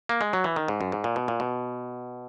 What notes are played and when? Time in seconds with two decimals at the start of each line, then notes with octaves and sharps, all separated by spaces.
0.09 A#3
0.21 G#3
0.33 F#3
0.44 E3
0.56 D#3
0.68 G#2
0.81 F#2
0.92 G#2
1.04 A#2
1.16 B2
1.28 A#2
1.40 B2